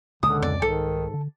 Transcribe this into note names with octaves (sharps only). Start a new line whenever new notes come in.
C#2 A#2 D3 D#6
F2 D5
C2 G#2 D#3 A4
D3